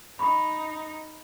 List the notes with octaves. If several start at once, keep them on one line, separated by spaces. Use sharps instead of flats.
D#4 B5 C#6